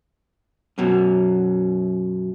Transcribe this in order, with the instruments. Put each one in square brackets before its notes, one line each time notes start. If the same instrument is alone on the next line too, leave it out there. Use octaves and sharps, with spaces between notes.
[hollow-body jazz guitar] F#2 B2 F#3